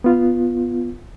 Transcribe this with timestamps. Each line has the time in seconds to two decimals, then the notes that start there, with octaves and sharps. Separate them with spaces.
0.04 B3 F4